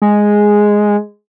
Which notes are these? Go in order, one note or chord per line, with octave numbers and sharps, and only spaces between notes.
G#3